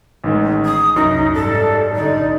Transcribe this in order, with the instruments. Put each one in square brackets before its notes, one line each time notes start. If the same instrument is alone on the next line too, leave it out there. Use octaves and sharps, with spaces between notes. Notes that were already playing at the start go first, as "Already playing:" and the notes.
[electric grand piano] A1 D#3 G#3
[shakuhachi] D#6
[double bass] C2 [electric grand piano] F#2 [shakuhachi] D#4
[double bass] G#2 G3 [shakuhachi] A4
[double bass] D3 D#4 [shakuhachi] D5